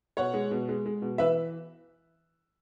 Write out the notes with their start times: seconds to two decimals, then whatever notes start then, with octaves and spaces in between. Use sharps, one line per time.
0.17 B2 C#5 F#5
0.34 G#3
0.51 B2
0.69 G#3
0.86 G#3
1.02 B2
1.18 E3 B4 E5